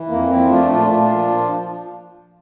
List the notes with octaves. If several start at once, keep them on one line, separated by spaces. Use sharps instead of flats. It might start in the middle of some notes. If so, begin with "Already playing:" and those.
Already playing: E3
F2 A#3
F3 C4 E4
A3 D4 F4
A#2 D4 F4
A#2 D4 F4
F3